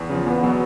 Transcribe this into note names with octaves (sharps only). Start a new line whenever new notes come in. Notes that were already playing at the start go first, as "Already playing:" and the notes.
Already playing: E2
C#3 F3
E2 B3
B2 F#3